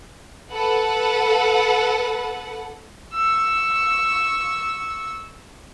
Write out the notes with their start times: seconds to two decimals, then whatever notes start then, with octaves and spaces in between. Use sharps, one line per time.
0.52 A4 B4 F#5
3.14 C#6 E6